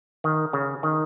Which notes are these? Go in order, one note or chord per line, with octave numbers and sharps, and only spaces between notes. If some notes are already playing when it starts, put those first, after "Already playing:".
D#3
C#3
D#3